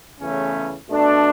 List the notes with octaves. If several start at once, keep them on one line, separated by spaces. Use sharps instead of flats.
E2 C#3 E3 A3 C#4
B2 A3 D4 A4